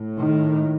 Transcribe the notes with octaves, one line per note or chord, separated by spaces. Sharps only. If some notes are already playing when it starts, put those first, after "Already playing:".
Already playing: A2
D#3